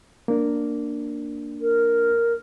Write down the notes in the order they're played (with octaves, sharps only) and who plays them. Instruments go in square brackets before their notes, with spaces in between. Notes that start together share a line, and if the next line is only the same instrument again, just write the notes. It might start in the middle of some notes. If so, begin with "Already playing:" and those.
[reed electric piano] A#3 D4
[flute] A#4